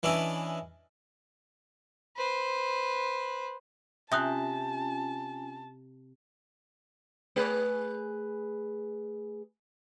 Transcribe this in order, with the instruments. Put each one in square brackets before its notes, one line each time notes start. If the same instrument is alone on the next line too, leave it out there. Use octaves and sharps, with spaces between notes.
[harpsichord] E3 C#4 D4 D#5 E5
[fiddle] B4 C5
[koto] C3 [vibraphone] C#4 F4 G#5 [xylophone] E5 D#6 F#6 [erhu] A5
[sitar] A3 G#4 B4